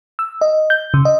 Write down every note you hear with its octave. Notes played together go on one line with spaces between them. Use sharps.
E6
D#5
G6
C#3
D#5